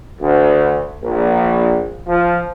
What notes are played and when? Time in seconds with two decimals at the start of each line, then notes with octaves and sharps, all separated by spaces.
0.21 D2
1.02 A#1
2.07 F3